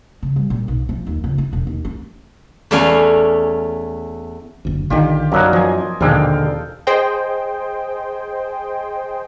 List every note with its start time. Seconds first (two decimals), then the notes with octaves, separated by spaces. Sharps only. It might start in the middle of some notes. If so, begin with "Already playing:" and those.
0.23 C#3
0.36 G3
0.50 A#2
0.68 B1
0.89 F3
1.06 D#2
1.24 C#2
1.38 E4
1.53 E1
1.67 D#2
1.85 C#4
2.71 E2 A3 C#4 D5 F5 G#5
4.65 F#1 D2
4.90 A#1 D3 D#3 F4 G4
5.32 F#2 F#3 A#3 D4 D#4
5.53 F3 D#5 G#5
6.01 A#1 D#2 B2 D3 G#3 A4 F5 G5
6.87 G#4 C5 D#5 G5